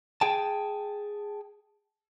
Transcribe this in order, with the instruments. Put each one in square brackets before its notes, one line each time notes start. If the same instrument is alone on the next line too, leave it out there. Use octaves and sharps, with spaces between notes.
[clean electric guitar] G#4 G5 A5